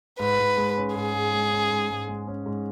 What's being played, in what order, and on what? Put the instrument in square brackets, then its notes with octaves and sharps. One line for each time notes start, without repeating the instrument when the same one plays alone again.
[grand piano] G#2 [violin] B4
[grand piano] G#2
G#3
C#4
[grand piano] G#2 [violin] G#4
[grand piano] G#2
G#3
C#4
G#2
G#2
G#3
C#4
G#2